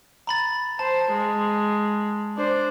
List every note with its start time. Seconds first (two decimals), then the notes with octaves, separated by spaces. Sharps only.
0.27 A#5 B5 A6
0.79 C5 A5
1.12 G#3
2.37 D4 C5